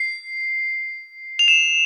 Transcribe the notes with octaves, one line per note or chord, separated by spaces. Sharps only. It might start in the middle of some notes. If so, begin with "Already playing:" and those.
Already playing: C7
F7
E7